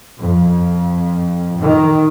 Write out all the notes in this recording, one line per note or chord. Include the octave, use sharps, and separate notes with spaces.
F2
D#3